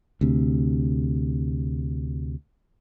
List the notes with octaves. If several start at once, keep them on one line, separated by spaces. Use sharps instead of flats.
D2 C3